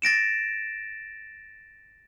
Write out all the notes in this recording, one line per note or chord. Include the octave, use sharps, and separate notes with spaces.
A6 A#6 D7 E7